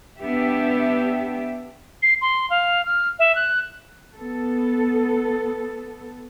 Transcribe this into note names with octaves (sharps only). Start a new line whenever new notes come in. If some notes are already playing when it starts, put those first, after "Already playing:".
B3 D4 G4 E5
C7
C6
F5
F6
E5
F#6
B3 A4